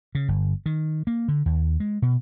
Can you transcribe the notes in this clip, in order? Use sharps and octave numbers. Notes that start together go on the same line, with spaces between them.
C#3
G1
D#3
A#3
D3
D#2
G#3
B2